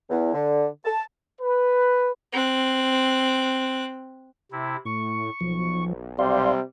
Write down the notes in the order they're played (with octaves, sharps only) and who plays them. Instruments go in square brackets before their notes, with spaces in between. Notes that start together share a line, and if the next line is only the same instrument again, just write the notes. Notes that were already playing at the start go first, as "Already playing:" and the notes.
[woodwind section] E2
D3
A5
[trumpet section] B4
[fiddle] C4 F#6
[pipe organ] C3 E4
[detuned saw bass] A2 [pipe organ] C#6
[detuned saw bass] B1 [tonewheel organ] F3
[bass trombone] C3 [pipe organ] G3 [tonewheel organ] D5 F5 C6